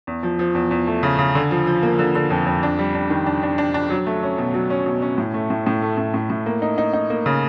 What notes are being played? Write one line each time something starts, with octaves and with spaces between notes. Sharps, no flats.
E2
F3
F3
E2
E2
A3
C#3
C#3
D3
F3
F3
A#3
D3
D3
F2
F2
D4
G3
D4
D#3
D4
D4
D4
D4
F#3
A3
C#4
B2
F#3
C#4
B2
C#4
A2
A3
A2
A2
A3
A2
A2
A2
A#3
D#4
D#4
D#4
A#3
C#3